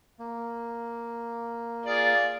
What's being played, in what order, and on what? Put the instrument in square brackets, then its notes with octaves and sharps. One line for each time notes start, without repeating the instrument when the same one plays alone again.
[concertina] A#3
[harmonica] F4 G#4 D5